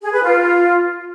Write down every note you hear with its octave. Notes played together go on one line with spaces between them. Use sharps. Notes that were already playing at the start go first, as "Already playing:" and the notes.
G#4
B4
F4